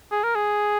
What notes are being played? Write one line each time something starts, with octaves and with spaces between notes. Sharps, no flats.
G#4
A#4
G#4